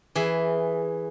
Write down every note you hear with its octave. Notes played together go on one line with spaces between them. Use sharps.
E3 G#4 E5